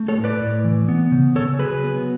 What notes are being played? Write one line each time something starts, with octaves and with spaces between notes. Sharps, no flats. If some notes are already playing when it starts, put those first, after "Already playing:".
Already playing: A3
A4 C#5
A2
B4 D5
A2
E3
B3
C#3
C#3 A4 C#5
F#3 G#4 B4
B3